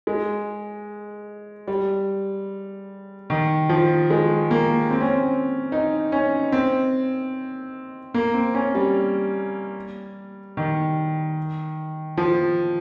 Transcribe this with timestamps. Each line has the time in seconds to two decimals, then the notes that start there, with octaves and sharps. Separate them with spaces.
0.07 G#3
1.68 G3
3.30 D#3
3.69 F3
4.10 G#3
4.51 A#3
4.91 C4
5.01 C#4
5.11 C4
5.72 D#4
6.12 C#4
6.52 C4
8.14 A#3
8.34 C4
8.54 C#4
8.75 G3
10.57 D#3
12.17 F3